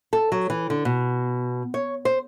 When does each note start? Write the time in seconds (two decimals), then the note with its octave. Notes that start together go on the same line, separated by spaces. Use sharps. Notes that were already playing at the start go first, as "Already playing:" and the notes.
0.13 A4
0.32 F#3
0.50 E3
0.70 D3
0.85 B2
1.74 C#5
2.05 C5